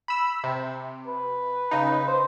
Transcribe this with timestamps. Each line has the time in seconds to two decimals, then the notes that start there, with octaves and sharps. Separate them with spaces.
0.08 B5 E6
0.44 C3
1.07 B4
1.71 C#3 D#4
2.07 C5